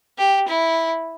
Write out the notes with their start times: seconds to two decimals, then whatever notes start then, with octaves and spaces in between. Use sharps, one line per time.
0.18 G4
0.48 E4